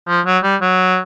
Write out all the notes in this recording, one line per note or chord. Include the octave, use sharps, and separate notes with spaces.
F3
F#3
G3
F#3